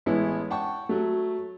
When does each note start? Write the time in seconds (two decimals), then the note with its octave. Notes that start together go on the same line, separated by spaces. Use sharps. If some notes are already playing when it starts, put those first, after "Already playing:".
0.06 A1 G#3 B3 C#4 E4
0.50 F#5 G5 A5 C#6
0.89 F#3 A3